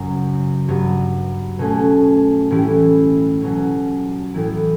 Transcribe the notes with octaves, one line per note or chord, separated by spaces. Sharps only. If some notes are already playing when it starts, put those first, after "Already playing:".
Already playing: F#2 C#3 F#3
G2 F#3 B3
B2 A3 C#4
A2 E3 G3 C#4 E4
B2 F#3 C#4
A2 E3 B3 E4